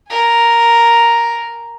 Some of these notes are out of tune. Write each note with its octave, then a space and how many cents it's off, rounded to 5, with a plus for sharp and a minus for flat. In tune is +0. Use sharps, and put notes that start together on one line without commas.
A#4 +0 G#5 +0